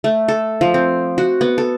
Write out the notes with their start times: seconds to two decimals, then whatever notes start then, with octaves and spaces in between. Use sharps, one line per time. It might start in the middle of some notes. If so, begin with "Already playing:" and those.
0.04 A3
0.28 A4
0.61 F3
0.74 C4
1.18 F#4
1.41 B3
1.58 A4